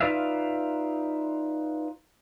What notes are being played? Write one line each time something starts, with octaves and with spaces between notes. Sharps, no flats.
D#4 F4 B4 D5 E5 F5